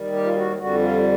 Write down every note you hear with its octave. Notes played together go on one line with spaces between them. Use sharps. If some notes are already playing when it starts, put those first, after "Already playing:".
Already playing: D#2 D#3 G3
G4
F4
F#4
F2 D3 G3 F#4
F4